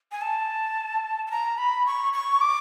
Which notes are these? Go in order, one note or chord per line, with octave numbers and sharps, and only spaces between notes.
G#5
A5
A5
A#5
B5
C#6
C#6
D6